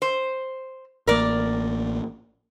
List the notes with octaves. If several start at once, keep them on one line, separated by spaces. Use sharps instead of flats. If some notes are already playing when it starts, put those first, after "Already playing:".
C5
A1 A#3 A#4 D5